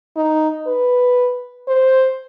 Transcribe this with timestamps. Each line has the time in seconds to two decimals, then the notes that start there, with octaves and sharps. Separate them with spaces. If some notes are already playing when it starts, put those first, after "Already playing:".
0.16 D#4
0.67 B4
1.68 C5